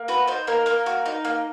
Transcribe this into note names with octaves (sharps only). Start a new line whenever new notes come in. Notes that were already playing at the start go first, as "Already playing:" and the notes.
Already playing: A#3
F#4 B4
D#4 C5
A#3 A#4
A#3 A#4
F#4
D#4
A#3